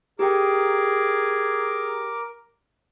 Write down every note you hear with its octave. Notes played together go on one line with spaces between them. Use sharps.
G4 G#4 A#4 G5 D6